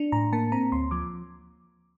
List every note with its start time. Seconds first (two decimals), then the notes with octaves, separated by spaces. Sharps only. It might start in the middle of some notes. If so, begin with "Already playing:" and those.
Already playing: D4
0.12 A2 A#5
0.33 A#3 A5
0.52 C4 A#5
0.72 D2 C6
0.91 F3 D6